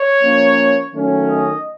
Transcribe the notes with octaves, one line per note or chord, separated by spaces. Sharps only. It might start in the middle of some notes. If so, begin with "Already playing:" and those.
Already playing: C#5
F3 A#3 C#4
D#3 F#3 A3 C#4
D#5